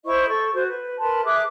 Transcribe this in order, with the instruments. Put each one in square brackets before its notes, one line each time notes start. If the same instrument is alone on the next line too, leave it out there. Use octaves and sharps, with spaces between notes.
[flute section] E4 C5 D#5 C#6
A4 C#6
F#4 C5
B4
A#4 B4 A5 C6
G#4 E5 D6 F#6